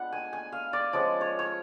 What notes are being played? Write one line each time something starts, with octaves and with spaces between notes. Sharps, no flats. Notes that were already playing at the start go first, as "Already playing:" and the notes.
Already playing: G#3 B3 D4 F4 F#5
G#5
G#5
F5
D5
F3 G#3 C#4 D5
C#5
C#5